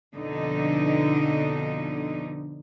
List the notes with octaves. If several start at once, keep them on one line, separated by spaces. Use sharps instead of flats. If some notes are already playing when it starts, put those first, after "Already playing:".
F2 B2 D3 D#4